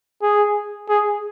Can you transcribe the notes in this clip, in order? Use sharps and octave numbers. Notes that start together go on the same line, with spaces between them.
G#4
G#4